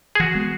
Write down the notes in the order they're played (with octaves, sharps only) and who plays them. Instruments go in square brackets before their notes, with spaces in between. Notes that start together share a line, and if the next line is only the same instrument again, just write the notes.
[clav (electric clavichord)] G#4
[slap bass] E3 [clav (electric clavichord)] F#4
[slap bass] G#3 B3